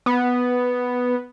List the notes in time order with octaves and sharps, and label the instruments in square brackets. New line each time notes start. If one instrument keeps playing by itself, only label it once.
[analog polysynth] B3